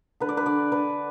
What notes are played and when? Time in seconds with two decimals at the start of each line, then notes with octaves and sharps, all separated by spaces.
0.20 D3 B4
0.29 D5
0.37 B4
0.46 D3 D5
0.72 D3 B4